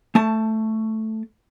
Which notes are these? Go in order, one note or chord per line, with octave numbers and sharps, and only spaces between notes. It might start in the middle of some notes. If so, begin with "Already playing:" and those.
A3 A5